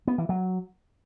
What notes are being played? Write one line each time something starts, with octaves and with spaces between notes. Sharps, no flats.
B3
E3
F#3